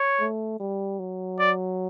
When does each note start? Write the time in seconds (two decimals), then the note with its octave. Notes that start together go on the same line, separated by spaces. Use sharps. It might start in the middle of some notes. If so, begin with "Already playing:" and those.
Already playing: C#5
0.20 A3
0.60 G3
0.99 F#3
1.39 D5